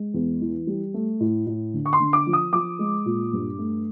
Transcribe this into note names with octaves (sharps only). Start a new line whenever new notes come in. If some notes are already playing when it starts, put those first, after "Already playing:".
Already playing: G#3
E2
E3
G3
A3
A2
A2
D3
C#6
C6
D3
D6
F3
D#6
F3 D6
G#3
A#2
G2
A3